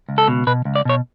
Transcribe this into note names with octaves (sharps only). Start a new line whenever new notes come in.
C#2
A4
B2
B2 B4
C#2
D5
B2 C#5